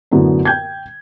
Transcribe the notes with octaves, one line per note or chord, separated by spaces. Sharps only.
F#2 A2 D3 B3
G5 G6 G#6